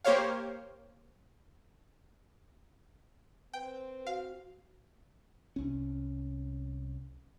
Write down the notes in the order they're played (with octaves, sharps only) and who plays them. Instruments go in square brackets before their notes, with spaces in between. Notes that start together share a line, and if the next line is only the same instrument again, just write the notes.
[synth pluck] A#3 G4 C5 C#5 F5
[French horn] C4 [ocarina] B4 [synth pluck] G5
[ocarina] F#4 [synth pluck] F5
[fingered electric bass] C2 C#4